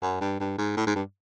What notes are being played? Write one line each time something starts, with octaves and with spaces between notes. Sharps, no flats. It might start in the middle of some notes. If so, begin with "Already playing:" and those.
F#2
G2
G2
G#2
A2
G#2
G2